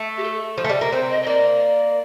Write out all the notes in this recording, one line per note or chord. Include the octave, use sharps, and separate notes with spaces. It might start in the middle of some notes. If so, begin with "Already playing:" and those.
Already playing: A3
G4
A4
F3
A3
G3
A#3
C4 C5
D#5
D#5
A#3 D5